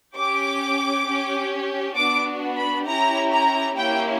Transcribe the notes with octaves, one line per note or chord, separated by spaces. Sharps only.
C#4 G4 D6
C#4 G4
B3 D4 F#4 D6
B5
C#4 E4 G4 A#5
A#5
A#3 C#4 E4 G4 G5